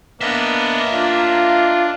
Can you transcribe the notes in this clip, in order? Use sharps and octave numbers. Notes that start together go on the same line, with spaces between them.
A#3 B3 D4 D#5 E5
D4 F4